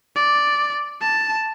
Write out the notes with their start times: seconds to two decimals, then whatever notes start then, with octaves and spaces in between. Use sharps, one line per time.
0.16 D5
1.02 A5